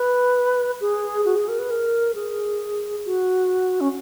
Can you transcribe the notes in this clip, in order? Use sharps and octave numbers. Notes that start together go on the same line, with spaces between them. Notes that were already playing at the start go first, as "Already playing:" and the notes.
Already playing: B4
G#4
F#4
G#4
A#4
B4
A#4
G#4
F#4
C#4